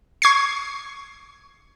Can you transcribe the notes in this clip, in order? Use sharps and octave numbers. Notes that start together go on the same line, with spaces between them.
C#6 G#6 C7